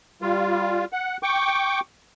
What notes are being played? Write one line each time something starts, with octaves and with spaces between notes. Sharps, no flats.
G3 F4
F#5
G5 C#6 D6